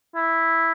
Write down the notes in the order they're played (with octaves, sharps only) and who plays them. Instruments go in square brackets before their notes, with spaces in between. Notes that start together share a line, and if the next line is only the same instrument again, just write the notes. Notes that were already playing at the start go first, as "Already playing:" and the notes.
[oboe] E4